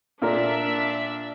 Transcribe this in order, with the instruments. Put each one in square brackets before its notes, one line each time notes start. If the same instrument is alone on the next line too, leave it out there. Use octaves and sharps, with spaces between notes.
[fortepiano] A#2 A#4 [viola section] D4 E5